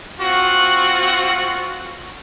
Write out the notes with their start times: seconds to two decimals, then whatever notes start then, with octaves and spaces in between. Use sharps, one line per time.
0.20 C4 F4 F#4